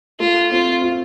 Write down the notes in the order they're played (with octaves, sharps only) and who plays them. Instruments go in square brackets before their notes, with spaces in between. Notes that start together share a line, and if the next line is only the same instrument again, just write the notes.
[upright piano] A3 [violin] F4
[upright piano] C4 [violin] F4
[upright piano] F4